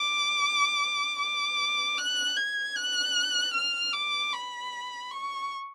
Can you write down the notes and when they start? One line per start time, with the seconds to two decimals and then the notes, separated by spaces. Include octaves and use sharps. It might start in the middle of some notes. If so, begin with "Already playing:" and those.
Already playing: D6
1.20 D6
1.98 F#6
2.37 G#6
2.76 F#6
3.54 F6
3.93 D6
4.33 B5
5.11 C#6